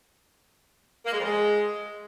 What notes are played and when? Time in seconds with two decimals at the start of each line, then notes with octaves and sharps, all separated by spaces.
1.05 A#3
1.12 G#3
1.18 F2
1.25 G#3